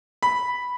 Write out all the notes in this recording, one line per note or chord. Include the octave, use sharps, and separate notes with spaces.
B5